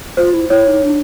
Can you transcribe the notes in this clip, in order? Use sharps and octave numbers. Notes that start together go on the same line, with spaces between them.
F4 C5
E4
E4 C#5
D#4
D4